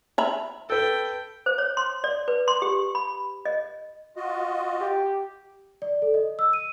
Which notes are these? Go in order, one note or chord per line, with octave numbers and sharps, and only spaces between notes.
E5 A#5 B5
A4 B4 G5
C5
C#5
C6
D5
B4
C6
G4
B5
D#5
F4 F#4 D#5
G4
D5
A4
D#5
E6
D#7